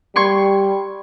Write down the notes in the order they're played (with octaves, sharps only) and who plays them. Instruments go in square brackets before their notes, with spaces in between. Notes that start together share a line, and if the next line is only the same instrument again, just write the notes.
[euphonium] G3 [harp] C6 C#6 G#6